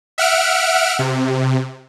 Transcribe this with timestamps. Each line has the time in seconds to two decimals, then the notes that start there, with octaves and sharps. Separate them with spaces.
0.18 E5 F#5 F6 D7
0.99 C3